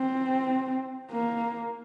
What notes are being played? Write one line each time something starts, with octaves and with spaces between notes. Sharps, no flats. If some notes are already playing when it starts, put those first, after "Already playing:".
Already playing: C4
A#3